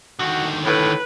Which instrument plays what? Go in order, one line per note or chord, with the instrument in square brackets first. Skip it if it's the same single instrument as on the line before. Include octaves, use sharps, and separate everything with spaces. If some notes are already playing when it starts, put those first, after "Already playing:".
[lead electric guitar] D3 D#3 [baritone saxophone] F#4
[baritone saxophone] A2 [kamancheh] B4